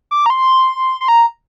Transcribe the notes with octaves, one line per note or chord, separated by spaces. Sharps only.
D6
A#5
C6
C6
A#5